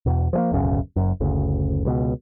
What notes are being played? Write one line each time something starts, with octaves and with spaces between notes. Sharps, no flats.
E2 B2
F3 G#3 A#3
D1 B1 F#2 C#3
F#1 F#2
F#1 D2 C#3
C#2 B2